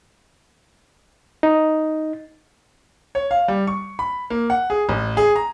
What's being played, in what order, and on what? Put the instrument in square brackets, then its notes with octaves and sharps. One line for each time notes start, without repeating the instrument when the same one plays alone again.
[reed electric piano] D#4
[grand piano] C#5
F5
G3
C#6
B5
A#3
F#5
G#4
A1
G#4
A#5